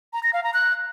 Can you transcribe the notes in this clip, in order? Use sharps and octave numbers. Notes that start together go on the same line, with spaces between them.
A#5
A#6
F5
A#5
F#6